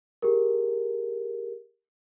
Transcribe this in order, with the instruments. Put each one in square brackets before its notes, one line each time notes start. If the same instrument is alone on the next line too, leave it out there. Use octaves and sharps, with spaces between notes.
[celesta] G4 G#4 A#4